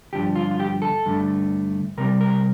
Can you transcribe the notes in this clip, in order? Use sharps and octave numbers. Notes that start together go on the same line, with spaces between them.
G2 D3 F3 G4
F4
F4
G4
A4
G2 D3 A3
C3 G3 C4 A#4
A#4